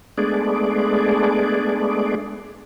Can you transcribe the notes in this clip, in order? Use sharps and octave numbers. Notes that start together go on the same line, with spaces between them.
G#3 A3 B3 D4 G#4 D5